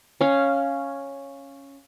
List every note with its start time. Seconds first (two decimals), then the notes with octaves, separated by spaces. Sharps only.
0.21 C#4 F5